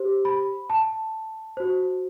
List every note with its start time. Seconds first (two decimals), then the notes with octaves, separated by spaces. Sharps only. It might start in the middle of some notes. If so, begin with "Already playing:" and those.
Already playing: G4 C5
0.25 B5
0.70 A5
1.57 F#4 C5